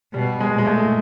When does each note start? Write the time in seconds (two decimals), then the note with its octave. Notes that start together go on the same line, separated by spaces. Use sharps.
0.14 B2 G3
0.40 G#3
0.54 A#2 G#3
0.67 A3